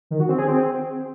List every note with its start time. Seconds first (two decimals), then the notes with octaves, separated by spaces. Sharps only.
0.11 D#3
0.20 F#4
0.29 C4
0.38 G#4
0.48 C4